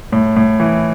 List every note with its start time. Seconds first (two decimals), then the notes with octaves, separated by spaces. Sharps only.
0.12 A2
0.36 A2
0.60 E3